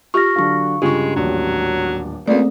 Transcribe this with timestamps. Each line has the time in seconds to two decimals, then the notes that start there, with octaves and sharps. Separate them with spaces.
0.14 F4 G4 C#6 F6 A#6
0.36 D3 F#3 D4 F5 C#6
0.82 G2 C#3 G#3 F4 G4 C#6
1.16 D#1 A1 F#3 D4
2.27 C#2 A3 A#3 C4 G#4 D5